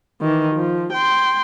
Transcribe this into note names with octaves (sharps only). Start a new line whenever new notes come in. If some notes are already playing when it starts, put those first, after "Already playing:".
D#3 E3
F3
G5 C6